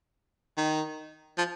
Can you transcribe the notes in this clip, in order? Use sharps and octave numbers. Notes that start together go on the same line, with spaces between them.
D#3
F3